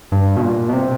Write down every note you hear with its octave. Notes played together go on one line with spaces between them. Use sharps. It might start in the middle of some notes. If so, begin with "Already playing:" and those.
G2
B2
A#2
B2
C3